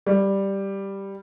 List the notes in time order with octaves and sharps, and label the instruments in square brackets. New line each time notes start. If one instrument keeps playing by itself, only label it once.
[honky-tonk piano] G3